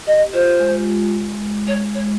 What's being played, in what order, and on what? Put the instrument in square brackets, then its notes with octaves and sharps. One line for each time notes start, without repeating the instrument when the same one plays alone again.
[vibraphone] G4 [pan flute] D#5
[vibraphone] F4 [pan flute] C5
[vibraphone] G#3
[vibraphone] G#3 [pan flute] C#5
[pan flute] C#5